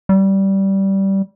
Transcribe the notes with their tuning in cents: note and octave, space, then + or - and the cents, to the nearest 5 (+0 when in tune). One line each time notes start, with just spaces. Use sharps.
G3 -15